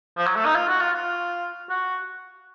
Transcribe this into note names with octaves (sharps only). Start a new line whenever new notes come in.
F3
F#3
A3
D#4
F4
F#4
F4
F4
F#4